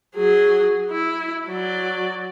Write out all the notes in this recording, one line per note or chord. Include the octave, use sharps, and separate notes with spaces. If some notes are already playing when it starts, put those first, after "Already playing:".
F#3 G#4
E4
F#3 D5